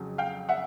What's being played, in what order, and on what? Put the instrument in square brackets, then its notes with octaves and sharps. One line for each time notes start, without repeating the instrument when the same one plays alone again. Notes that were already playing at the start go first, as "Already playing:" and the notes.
Already playing: [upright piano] F2 C#3 F#3
F5 G5
E5 F#5